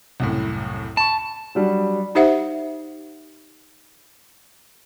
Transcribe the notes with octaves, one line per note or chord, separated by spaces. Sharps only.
C2 F#2 A2
A5 B5 C#6
F#3 G3 D4
D#4 G4 C5 E5 F#5